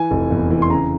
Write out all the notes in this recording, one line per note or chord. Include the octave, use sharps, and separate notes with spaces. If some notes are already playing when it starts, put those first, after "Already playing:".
Already playing: E3 G#5
F1
E2
E3
C6
C#3 A#5